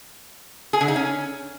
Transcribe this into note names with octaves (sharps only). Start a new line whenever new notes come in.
G#4
D3
D#4
C#4